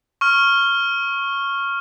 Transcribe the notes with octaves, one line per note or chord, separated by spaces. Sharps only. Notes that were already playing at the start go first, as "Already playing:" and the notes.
C#6 F6